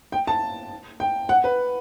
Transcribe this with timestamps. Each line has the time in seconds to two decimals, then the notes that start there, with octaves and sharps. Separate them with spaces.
0.12 G5
0.27 A5
1.00 G5
1.29 F#5
1.44 B4